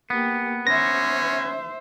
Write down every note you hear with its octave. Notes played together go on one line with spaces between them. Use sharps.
A#3 B3 G4
C#4 C5 E5 A#6